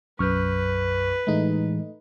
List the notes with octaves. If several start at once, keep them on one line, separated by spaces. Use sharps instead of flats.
B1 F#2 B4 C#6 F6 G6
A2 E3 G#3 A3 D#4